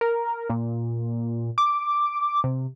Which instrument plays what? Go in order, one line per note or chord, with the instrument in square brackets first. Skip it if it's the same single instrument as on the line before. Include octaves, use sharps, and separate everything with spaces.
[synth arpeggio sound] A#4
A#2
D6
C3